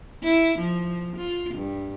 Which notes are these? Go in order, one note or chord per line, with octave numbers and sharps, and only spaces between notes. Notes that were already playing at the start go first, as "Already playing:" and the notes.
E4
F3
F4
G2